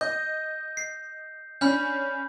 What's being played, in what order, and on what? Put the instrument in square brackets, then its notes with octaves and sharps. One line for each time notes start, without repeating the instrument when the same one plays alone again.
[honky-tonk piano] D#5 [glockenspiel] G6
[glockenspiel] C7
[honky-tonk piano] C#4 D4 [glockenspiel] B5 F6 G6